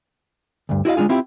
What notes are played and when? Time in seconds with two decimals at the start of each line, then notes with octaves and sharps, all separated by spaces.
0.69 D2 G2
0.85 E4 F#4 B4 D#5 F5
0.97 G#3 A#3 D4 F4 G#4
1.09 C4 E4 F4 G4